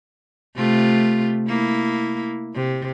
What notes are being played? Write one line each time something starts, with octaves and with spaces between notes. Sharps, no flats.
C3 A3 F4
A#3 E4
C3